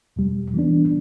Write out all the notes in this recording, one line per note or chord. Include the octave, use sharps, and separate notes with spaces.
E2 B2 G3
E3 B3 D4